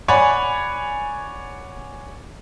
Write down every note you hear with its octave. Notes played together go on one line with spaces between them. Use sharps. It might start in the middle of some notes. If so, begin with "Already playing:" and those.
C#5 D5 F#5 G#5 B5